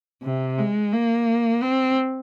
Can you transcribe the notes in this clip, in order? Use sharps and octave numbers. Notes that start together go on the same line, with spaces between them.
C3
G#3
A#3
C4